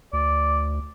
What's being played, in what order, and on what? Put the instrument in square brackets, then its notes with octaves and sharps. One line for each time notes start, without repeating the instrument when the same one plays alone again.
[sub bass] D2 [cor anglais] D5